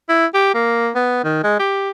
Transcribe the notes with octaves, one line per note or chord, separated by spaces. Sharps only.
E4
G4
A#3
B3
D#3
G#3
G4